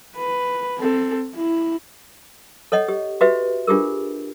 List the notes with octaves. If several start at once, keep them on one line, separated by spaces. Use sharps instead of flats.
B4
C4 A4
E4
A4 C#5 D#5 F#5
G4
F#4 G4 B4 E5
D4 F4 G4 G#4 A#4